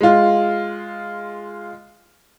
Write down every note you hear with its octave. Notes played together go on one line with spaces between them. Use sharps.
G#3 F4